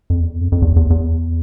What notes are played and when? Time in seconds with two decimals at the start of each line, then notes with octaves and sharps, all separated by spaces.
0.10 F2
0.21 E2
0.41 F2
0.52 F2
0.62 E2
0.76 E2
0.90 E2